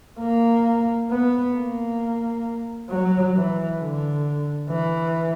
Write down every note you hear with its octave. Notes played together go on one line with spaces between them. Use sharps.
A#3
B3
A#3
F#3
E3
D3
E3